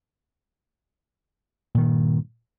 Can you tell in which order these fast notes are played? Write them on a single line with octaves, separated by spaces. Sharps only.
A#2 D#3 G2